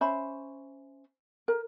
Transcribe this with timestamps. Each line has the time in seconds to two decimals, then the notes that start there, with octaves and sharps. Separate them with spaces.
0.01 C#4 C5 E5 B5
1.48 A#4